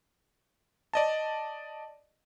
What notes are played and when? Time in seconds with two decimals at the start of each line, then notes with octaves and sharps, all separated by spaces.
0.94 D5 D#5 A5